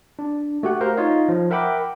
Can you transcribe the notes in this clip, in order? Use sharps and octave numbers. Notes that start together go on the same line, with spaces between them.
D4
A3 F#4 G4 F#5
A#4 C5 F5
D#4 F4 C#5 D#5 F5
F3
A#4 E5 F#5 G5 B5 D6